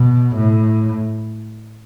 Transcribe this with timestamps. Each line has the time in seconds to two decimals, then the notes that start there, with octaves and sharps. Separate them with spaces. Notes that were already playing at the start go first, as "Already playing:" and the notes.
Already playing: B2
0.36 A2